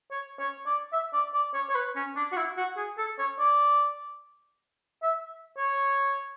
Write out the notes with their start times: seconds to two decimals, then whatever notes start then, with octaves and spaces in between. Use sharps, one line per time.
0.11 C#5
0.39 C#5
0.66 D5
0.93 E5
1.13 D5
1.34 D5
1.54 C#5
1.70 C#5
1.75 B4
1.96 C#4
2.16 D4
2.32 F#4
2.37 E4
2.57 F#4
2.77 G#4
2.98 A4
3.19 C#5
3.39 D5
5.02 E5
5.57 C#5